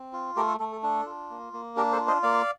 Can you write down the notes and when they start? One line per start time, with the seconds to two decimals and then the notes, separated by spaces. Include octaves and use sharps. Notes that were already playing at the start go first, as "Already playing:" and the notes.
Already playing: C4
0.13 F4
0.36 A3 G4 A#4
0.48 A4
0.60 A3 A4
0.72 A4
0.83 D4 A4
1.06 F4
1.30 A#3
1.53 A#3
1.76 D4 G4 A#4
1.92 A4 C5
2.00 F4
2.07 C5 D#5
2.23 A#3 D5 F5